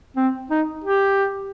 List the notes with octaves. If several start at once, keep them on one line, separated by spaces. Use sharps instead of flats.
C4
D#4
G4